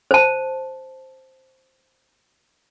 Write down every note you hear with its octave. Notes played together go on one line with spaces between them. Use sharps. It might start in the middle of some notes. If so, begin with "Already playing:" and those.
C5 A5